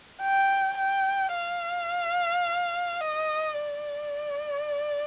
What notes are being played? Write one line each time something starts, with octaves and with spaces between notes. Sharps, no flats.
G5
G5
F5
D#5
D5